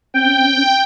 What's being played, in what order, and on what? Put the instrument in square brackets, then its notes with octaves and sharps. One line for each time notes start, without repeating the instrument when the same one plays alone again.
[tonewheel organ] C4 C#4 [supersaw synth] G5